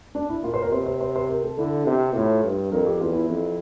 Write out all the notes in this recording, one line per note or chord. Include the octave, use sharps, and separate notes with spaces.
D4
E4
A#2 F4
C5
A#4
C3 C5
C5
C5
C5
A#4
A4
D3 E4
C3
A2 F4
G2
F2 A#4
G4
E2 F4
E4
F2